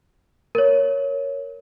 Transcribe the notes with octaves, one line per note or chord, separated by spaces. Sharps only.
A#4 C#5